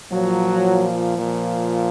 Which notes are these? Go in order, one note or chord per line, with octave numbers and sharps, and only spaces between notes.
A#2 F3 F#3
A#2 F3